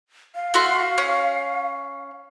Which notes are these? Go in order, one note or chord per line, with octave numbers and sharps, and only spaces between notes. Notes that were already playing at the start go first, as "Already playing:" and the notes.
F5
A3 F#4 C6
C#4